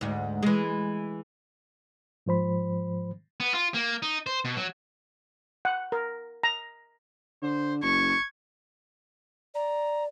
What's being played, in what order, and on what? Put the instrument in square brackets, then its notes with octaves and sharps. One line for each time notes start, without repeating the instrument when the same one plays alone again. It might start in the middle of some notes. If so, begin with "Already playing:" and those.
[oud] D2 G#2
E3 G#3
[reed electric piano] G#2 F3 C5 B5
[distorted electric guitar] B3
F4
A#3
D#4
C5
B2
F#3
[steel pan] F#5
A#4
A#5
[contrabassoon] D3 [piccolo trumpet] C5
[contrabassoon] F#1 [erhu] C#6 [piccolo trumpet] G#6
[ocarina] D5 [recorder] A#5